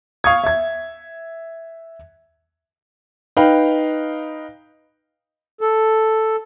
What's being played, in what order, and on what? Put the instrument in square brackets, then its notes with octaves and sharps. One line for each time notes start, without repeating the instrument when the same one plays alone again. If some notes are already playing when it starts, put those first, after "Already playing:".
[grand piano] F5 C#6 D#6 G#6
E5 G#6
[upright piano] D#4 B4 F5 G5
[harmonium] A4